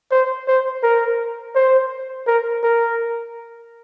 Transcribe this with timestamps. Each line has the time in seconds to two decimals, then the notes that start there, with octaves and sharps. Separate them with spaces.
0.11 C5
0.48 C5
0.83 A#4
1.55 C5
2.27 A#4
2.63 A#4